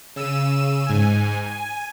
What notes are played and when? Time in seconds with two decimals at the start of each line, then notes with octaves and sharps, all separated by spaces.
0.16 C#3 E6 D#7 E7
0.86 G#2 G#5
1.46 G#5